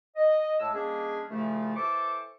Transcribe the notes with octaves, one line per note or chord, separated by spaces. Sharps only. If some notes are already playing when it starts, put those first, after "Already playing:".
D#5
A2 G#3 A5 E6
D#3 G3 A#3 C#4 D4 G#4
C2 A#2 C#3 F3 A3
E3 A4 C5 A5 C#6 D6